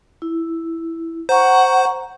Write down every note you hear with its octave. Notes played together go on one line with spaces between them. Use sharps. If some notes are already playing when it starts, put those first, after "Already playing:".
E4
C5 F#5 A#5 C#6